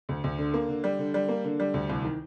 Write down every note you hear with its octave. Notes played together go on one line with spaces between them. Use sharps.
D2
D2
D3
A#3
D3
G3
D3
G3
A#3
D3
G3
D2
C2
D#3